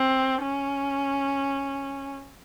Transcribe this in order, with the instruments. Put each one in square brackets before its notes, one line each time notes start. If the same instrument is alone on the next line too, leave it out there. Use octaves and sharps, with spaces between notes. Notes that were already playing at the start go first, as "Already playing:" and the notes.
Already playing: [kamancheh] C4
C#4